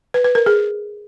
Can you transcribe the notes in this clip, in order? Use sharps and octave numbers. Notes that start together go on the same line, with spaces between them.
B4
B4
A#4
G#4